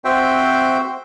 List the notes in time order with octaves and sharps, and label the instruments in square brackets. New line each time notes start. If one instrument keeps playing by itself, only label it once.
[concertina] C4 F#4 C5 E5 G5